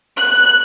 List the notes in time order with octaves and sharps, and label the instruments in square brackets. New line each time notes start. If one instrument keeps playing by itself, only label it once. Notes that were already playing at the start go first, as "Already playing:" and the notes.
[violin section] F#6